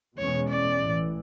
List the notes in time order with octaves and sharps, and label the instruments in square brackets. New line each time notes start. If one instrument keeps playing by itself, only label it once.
[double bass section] E2 B2 G#3 C#4 [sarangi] C#5
[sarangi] D5
[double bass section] A1 A2 E3